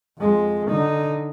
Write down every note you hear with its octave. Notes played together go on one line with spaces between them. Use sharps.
F2 G#3
D3 D#4